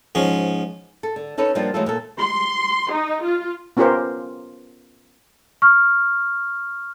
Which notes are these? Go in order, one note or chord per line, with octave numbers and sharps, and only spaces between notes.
G#2 F3 C#4
A4
D3
C#4 D#4 A4 B4 C#5
F3 G3 A#3 B3 D4 F4
E3 F#3 G#3 A3 F4 A4
A#2 A4
C6
D#4
F4
B3 C#4 F4 G4 A#4 C5
C#6 F6